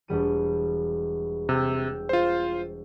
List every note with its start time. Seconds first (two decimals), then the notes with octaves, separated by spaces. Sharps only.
0.08 E1 G3 D#7
1.49 C3 G5 E6
2.09 F4 C5